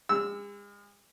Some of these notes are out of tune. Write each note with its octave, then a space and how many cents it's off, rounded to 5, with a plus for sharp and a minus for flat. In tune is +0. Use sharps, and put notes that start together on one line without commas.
G#3 -40 E6 +0